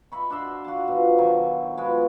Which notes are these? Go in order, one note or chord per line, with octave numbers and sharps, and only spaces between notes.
D#5 E5 B5 C#6
D4 F#4 E5 C6
F#4 D5 F5 A5
B2 F3
D#3 F#3 G#5
G#3 B3 F4 F#4